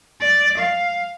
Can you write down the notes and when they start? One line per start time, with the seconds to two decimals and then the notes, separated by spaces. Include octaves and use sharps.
0.21 D5
0.58 F5